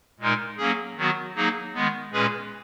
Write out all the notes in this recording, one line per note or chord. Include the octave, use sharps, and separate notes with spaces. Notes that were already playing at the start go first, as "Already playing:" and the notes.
A#2 G#3 D#4 A#4
F#3 A#3 C#4 G#4
D#3 F#3 B3 F#4
F#3 A#3 D#4 G#4
D#3 G#3 B3
A#2 G#3 C#4 G#4 B4